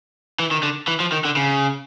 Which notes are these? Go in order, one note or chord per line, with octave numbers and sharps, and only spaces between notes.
E3
D#3
D3
E3
F3
D#3
D3
C#3